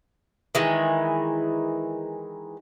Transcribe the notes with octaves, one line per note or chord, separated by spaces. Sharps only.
D#3 E3 G#3